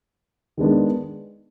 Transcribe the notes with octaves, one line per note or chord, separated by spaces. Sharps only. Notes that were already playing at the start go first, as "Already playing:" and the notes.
D#3 G#3 B3 D4